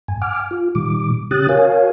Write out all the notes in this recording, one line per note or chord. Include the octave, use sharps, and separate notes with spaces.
G2 G#5
F#5 G#5 D6 F6
F4
A#2 D#3 G3 D6
C#3 C#4 G4 D#6 F#6 A6
F#4 A#4 C#5 F5 G#5